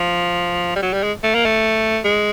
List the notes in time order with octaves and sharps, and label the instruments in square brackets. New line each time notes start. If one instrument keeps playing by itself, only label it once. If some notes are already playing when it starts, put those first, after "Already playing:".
Already playing: [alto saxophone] F3
G3
F#3
G3
G#3
A3
A#3
A3
G#3